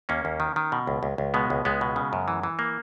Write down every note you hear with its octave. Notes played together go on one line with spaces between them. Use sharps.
D#2 A#3 C#4
D#2
D#3
D#3
B2
C#2
C#2
C#2
B2 G#3 B3
C#2
C#2 G#3 B3
B2
C#3
F#2
E3
E3
A#3